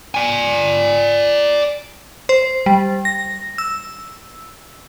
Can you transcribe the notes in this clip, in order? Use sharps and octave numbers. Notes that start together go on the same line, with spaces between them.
D5 G#5
C5
G3
A#6
E6